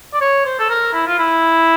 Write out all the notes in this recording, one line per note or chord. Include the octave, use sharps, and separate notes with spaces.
D5
C#5
C5
A4
A#4
E4
F4
E4